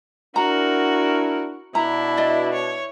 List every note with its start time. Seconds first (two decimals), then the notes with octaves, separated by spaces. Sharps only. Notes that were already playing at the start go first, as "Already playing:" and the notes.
0.36 D4 E4 F#4 A#4 A#5
1.75 B2 D4 E4 A#5
2.17 D5 D#5
2.54 C#5